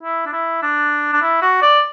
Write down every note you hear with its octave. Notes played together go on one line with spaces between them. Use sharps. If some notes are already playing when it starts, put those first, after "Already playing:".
E4
D4
E4
D4
D4
E4
F#4
D5